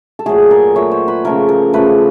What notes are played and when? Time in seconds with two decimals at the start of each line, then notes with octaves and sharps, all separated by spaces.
0.19 A4
0.26 A#2 F#3 A3 G#4
0.51 A#4
0.76 A#2 F#3 A3 C#5
0.91 C5
1.08 B4
1.25 C#3 F3 A3 A#4
1.49 A#4
1.73 C#3 F3 A3 B4